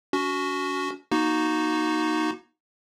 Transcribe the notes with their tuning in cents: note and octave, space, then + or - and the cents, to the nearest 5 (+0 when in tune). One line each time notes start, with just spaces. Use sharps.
C#4 +45 F#4 +0
A#3 +35 D#4 +0 F#4 +0